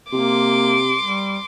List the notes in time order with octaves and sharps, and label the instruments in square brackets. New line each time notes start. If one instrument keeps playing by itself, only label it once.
[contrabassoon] C3 [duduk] A#3 [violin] C6 D6
[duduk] G3